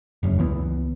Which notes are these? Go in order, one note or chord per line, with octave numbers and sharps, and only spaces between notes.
F1 F#2 C#3
C#2 E3 G3 B3